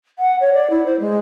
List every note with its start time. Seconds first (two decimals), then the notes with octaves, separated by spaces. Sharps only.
0.18 F#5
0.40 C#5
0.53 D5
0.70 E4
0.85 C5
1.00 G#3